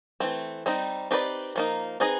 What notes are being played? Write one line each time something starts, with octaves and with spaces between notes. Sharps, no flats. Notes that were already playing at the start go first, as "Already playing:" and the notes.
E3 A3 C4
G3 C4 D#4
C4 D#4 G4 B4 D5
F3 A#3 D#4
C4 D#4 G#4 B4 D#5